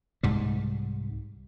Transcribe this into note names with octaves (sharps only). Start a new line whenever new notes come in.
C2 G#2 G3